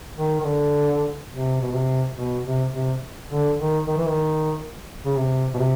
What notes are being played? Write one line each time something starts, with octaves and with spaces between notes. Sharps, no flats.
D#3
D#3
D3
C3
B2
C3
B2
C3
C3
D3
D#3
D#3
E3
D#3
C#3
C3
B2
C3